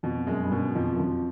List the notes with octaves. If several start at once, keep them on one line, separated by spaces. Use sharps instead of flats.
F2 B2
F#2 G#3
G2
F#2 B2
F2 F3
F#2
F2 F3